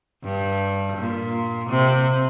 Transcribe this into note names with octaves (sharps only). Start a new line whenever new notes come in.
G2
A#2
C3